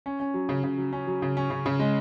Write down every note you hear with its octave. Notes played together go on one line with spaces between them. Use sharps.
C#4
C#4
F#3
C#3
C#3
F#3
C#4
F#3
C#3
C#4
C#3
C#3
G#3